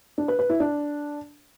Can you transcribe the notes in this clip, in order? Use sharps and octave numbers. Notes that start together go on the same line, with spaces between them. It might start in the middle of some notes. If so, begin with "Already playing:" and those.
D4
B4
B4
E4
D4